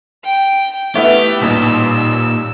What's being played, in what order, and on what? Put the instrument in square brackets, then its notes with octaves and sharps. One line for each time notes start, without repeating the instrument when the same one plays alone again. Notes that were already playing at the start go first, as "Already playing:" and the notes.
[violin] G5
[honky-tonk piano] A3 B3 E4 [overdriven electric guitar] G4 [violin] F6
[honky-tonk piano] A1 D#2 G3 [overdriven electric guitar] A#2 [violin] E6